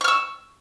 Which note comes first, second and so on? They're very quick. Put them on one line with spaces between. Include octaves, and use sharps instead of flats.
C#6 F6 E6